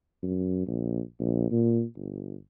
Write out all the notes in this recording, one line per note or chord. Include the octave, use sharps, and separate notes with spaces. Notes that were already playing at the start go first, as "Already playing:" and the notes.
F#2
A#1
A#1
A#2
G1